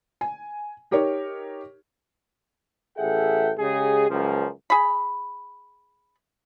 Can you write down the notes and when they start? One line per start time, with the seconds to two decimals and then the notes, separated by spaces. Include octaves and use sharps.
0.21 G#5
0.91 D#4 G4 A#4 C#5
2.98 A1 G#4 A4 E5 F#5 G5
3.58 C#3 G#3 G4 G#4
4.10 C#2 F#2 F3
4.70 G#4 B5